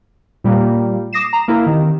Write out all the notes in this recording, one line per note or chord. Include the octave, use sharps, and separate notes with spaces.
A#2 G3 A#3
D6 D#6 A#6 C7 E7
A#5
A#3 E4 A#4
C3 D#3